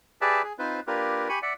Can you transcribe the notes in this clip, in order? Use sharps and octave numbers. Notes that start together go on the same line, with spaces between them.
G4 G#4 B4 D5 E5 A5
G#4
C4 D#4 F4 B4 C5
A#3 D4 F4 G4 A#4 B4
G4 G#5 B5 C#6
D5 E5 F#5